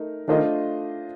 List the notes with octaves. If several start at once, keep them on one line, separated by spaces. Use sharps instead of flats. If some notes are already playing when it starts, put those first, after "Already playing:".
Already playing: A3 D#4 A#4
D#3 A3 D4 F4 C5 D#5